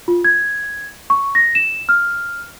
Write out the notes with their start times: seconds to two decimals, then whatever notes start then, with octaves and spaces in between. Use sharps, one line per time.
0.08 F4
0.25 G#6
1.10 C#6
1.35 A#6
1.55 E7
1.89 F6